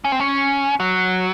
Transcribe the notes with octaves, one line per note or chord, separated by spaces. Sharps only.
C#4
C4
C#4
F#3